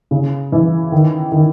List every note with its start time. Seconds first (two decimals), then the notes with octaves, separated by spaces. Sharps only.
0.11 C#3
0.52 E3
0.92 D#3
1.32 D#3